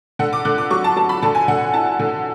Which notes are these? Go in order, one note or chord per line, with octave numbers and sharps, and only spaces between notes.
D3 F#5
D6
D3 F#6
D6
F#3 C#6
A5
F#3 A5
B5
D3 A5
G#5
D3 F#5
E4 A5
D3